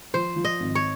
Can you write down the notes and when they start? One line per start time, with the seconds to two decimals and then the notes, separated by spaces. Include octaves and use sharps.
0.14 F3 C5
0.36 F3
0.44 D#5
0.60 G#1
0.75 C#5